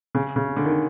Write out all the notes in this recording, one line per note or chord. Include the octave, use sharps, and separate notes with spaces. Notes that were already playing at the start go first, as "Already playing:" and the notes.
C#3
C#3
D3
D#3